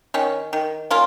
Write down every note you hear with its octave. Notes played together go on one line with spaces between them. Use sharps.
D#3 C#4
D#3
A#3 C#4 F4